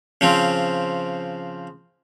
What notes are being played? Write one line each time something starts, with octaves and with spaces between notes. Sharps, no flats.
C#3 F3 C4